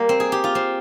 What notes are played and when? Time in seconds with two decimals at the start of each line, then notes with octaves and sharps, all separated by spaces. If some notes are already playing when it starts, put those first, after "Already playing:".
Already playing: G3 A#3
0.09 C4
0.20 G#4
0.32 G4
0.44 F4
0.55 C4